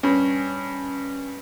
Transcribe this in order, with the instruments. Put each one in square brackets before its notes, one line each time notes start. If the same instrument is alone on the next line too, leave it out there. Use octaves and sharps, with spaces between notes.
[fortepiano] G2 [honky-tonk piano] C#4